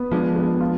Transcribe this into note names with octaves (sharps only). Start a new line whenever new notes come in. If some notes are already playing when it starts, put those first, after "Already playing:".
Already playing: B3
F3 G#3 D4
B3
F4